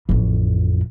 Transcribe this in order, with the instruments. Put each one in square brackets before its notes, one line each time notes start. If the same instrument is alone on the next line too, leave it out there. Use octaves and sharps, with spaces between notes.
[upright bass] A1 F2